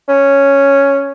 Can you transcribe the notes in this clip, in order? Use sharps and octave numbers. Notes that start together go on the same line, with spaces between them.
C#4